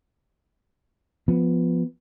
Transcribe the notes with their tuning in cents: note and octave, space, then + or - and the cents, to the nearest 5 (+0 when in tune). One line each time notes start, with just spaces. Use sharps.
F3 +0 B3 +0